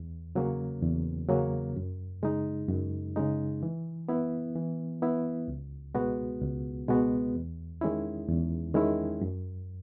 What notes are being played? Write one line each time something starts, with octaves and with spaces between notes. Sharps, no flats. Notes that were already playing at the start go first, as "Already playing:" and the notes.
Already playing: E2
C#3 F#3 A#3 C#4
E2
C#3 F#3 A#3 C#4
F#2
C#3 G#3 D#4
F#2
C#3 G#3 D#4
E3
B3 E4
E3
B3 E4
C#2
B2 G#3 B3 F#4
C#2
B2 G#3 B3 F#4
E2
D#3 G#3 C#4 E4
E2
D#3 G#3 C#4 E4
F#2